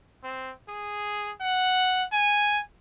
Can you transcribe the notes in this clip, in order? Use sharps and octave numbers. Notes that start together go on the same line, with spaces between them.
C4
G#4
F#5
G#5